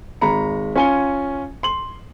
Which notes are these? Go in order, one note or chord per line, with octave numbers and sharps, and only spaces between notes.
G#1 G#3 A#5 B5 C#7
C#4 F4 G#5 C#7 G7
C6 F#7